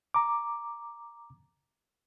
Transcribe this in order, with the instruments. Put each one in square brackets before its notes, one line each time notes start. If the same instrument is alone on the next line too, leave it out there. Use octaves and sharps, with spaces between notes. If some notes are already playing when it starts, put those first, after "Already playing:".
[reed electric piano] A#5 D6